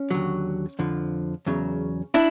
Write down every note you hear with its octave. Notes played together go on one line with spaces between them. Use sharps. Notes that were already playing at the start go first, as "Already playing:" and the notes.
Already playing: C#4
D#2 D3 F#3
F2 D3 F3
E2 C#3 F#3
D4 E4